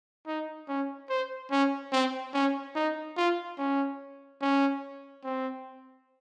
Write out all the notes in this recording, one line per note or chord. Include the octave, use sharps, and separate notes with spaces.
D#4
C#4
C5
C#4
C4
C#4
D#4
F4
C#4
C#4
C4